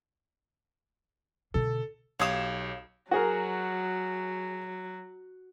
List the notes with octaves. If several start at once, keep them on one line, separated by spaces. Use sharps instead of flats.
B2 D3 A4
B1 G4 C#5 F5 D#6 E7
F#3 F#4 G#4 A#4